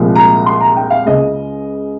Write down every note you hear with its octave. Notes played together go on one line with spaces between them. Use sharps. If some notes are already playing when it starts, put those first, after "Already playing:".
Already playing: C2 A#2 F3 G#3
A#5
C6
A#5
G5
F5
C#2 C#3 G#3 D#5